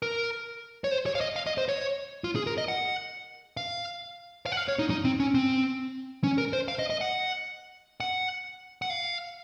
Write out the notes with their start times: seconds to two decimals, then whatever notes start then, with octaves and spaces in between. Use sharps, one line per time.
0.02 A#4
0.84 C#5
0.91 C5
1.06 C#5
1.15 F5
1.21 D#5
1.36 F5
1.47 D#5
1.58 C5
1.69 C#5
2.24 F4
2.36 G#4
2.47 A#4
2.58 D#5
2.68 F#5
3.57 F5
4.46 F5
4.52 F#5
4.57 F5
4.68 C#5
4.79 D#4
4.90 D#4
5.05 C4
5.20 C#4
5.35 C4
6.24 C#4
6.38 A#4
6.53 C5
6.68 F5
6.79 D#5
6.90 D#5
7.01 F#5
8.00 F#5
8.82 F#5
8.90 F5